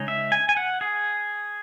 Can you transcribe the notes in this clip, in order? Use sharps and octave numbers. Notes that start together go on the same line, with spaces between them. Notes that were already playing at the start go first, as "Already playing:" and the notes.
Already playing: C#3 G#3 D#4
E5
G#5
G#5
F#5
G#4